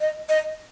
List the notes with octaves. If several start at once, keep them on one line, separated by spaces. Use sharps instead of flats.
D#5
D#5